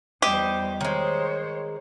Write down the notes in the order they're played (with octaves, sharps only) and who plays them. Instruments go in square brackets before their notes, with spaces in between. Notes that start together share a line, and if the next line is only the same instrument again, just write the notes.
[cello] E2 G3 [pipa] G4 [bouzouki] C5 D#5
[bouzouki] D#3 G#3 [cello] C5 C#5